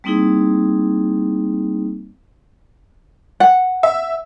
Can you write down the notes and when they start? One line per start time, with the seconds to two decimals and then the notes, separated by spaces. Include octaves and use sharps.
0.04 G3 A#3 C4 D#4 E4 G#4
3.40 F#5
3.83 E5